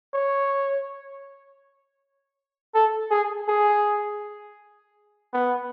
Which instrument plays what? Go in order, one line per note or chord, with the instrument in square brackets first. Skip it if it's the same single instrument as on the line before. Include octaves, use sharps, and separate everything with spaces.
[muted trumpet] C#5
A4
G#4
G#4
B3